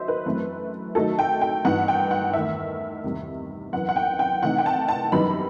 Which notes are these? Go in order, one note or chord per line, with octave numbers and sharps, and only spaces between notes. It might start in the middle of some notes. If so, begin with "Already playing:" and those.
Already playing: D#3 F#3 D#4 C5 D#5 E5
B4
F#2 E3 A3 C4
D#3 F#3 A3 D#4 A4
G5
G5
G2 E3 B3 D#4 F#5
G5
F#5
E2 D#3 A3 E5
E2 C3 D#3 G3
F#2 E3 B3 F#5
F#5
G5
G5
C3 E3 A3 D#4 F#5
G5
A5
A5
F#2 E3 G3 B3 D#4 B5